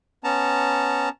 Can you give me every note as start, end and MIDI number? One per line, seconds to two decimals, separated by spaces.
0.24 1.09 59
0.24 1.09 61
0.24 1.09 81
0.24 1.09 82